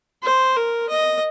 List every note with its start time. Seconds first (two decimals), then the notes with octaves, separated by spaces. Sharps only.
0.23 C5
0.56 A#4
0.89 D#5